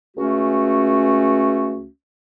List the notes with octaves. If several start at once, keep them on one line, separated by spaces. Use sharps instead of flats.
C#2 A3 C#4 F#4